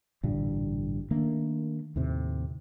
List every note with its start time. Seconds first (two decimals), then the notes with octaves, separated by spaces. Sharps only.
0.23 A1 G2 A#2 D3
1.11 D#3 A3 A#3 D4
1.96 D#2 A2 C3